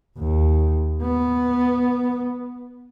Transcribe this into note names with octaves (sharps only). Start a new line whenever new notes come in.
D#2
B3